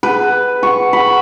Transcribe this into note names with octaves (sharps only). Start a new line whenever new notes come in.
B4
C#6
B5